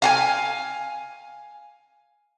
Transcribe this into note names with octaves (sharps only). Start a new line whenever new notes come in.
F5 F#5 G#5